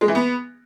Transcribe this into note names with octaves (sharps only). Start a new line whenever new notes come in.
G#3
E3
B3